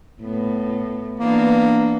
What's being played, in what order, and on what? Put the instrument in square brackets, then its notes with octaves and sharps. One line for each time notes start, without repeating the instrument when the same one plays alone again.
[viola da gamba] A2 B3
[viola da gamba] E3 B3 D4 [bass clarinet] A#3